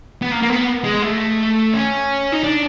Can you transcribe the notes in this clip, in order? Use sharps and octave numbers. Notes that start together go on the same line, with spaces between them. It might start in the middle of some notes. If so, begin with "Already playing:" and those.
B3
A#3
A#3
B3
G#3
A3
C#4
D#4
D4